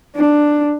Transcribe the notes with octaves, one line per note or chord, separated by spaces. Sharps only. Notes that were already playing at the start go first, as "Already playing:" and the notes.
D4